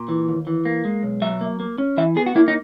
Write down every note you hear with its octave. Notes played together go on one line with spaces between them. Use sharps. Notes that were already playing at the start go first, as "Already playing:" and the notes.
Already playing: A#2
E3
D#2
E3
A#3
G#3
B1
F#3 E5
A#3
A#3
C#4
E3 E5
B3 G#4
F#4
A#3 E4
D#4